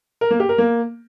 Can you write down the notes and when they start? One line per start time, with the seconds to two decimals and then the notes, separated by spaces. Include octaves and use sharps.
0.21 A#4
0.31 A#3
0.40 G4
0.49 A#4
0.58 A#3